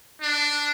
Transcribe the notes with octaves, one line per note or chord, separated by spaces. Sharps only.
D4